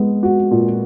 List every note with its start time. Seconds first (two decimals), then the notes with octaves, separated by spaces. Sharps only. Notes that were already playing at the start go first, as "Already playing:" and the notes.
Already playing: G#3 B3
0.23 F#4
0.51 A#2